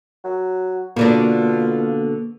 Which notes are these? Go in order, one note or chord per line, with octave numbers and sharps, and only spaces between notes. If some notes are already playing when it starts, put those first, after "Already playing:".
F#3
B2 D3 A#3 D4 F4